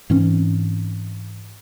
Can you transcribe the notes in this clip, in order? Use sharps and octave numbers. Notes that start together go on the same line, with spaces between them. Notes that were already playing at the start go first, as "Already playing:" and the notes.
G#2 E3 C4 C#4